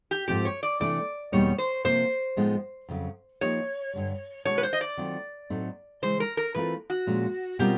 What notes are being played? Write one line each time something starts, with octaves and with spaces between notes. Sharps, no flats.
G4
G#2 F3 A3 C4 G4
C#5
D5
C3 E3 A3 D4 D5
E2 B2 G3 A#3 D#4 C#5
C5
C3 F3 A#3 C5
A2 F3 G#3 B3 D#4
F2 C#3 F#3
F3 A#3 D#4 G4 A#4 C#5
G2 D3 G3
B2 G#3 C#4 F#4 A4 C#5
B4
C5
D#5
D5
D#3 F#3 A3 C4 F4
A2 F#3 A3 C4 D#4
C#3 E3 G#3 C5
A#4
A#4
E3 A3 C4 F4 A#4 B4
F#4
A#2 F3 G#3 C#4
B2 G3 C4 F4 G4 A#4